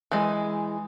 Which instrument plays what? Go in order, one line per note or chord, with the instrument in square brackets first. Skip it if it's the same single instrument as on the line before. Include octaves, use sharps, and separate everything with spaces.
[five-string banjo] E3 G#3